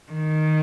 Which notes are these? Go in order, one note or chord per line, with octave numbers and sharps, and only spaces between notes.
D#3